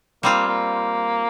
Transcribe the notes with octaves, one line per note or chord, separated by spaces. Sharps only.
G3 A#3 C4 F4
A#3